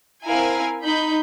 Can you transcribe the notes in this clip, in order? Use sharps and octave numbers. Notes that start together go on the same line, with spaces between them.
C4 E4 A#4 F5 G#5
D#4 B5 G6